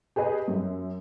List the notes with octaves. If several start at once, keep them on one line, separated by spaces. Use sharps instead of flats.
G4 G#4 B4 D#5
F#2